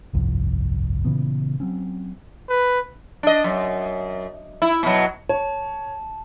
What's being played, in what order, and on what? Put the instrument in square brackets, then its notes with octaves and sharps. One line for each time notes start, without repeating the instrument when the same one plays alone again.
[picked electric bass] G1 C2 F2
A#2 C#3 E3 B3
F#3 C4 C#4
[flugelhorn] B4
[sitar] D4 D#5
F#2
E4
B2 F#3
[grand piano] C#5 [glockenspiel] A5